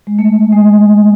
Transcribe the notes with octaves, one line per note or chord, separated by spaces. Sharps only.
G#3
A3
G#3